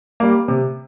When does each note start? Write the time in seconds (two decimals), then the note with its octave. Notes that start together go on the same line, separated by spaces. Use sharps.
0.20 G3 A#3
0.48 C3